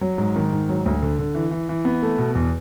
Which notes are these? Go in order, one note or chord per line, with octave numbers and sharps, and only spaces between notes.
F#3
G#2
D#3
G#2
F#3
D2
D3
D3
E3
E3
E3
B3
A3
B2
E2